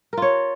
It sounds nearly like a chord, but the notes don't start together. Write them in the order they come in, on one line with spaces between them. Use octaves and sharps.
A#4 F4 C#5